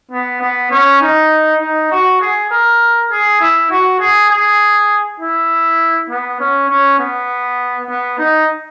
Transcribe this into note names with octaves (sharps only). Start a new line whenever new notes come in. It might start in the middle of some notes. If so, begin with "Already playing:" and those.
B3
B3
C#4
D#4
D#4
F#4
G#4
A#4
G#4
E4
F#4
G#4
G#4
E4
B3
C#4
C#4
B3
B3
D#4